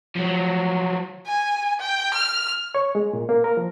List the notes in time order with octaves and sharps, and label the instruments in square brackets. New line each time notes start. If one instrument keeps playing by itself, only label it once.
[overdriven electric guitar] F3 F#3
[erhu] G#5
G5
F6
[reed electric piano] C#5
G#3
A#2
A#3
A#4
F3